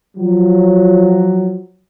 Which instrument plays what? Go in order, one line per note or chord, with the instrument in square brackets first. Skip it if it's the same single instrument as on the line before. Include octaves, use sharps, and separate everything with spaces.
[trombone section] F3 F#3